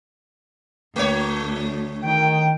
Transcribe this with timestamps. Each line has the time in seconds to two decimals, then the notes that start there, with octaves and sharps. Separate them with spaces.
0.96 D2 A3 C#5
2.04 D#3 G5